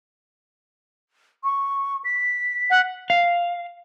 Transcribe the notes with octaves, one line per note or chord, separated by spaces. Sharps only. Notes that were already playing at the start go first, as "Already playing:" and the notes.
C#6
B6
F#5
F5